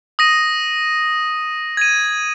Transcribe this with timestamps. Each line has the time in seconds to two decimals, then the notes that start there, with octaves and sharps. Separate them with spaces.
0.19 D#6 A#6 D#7
1.77 G#6 D#7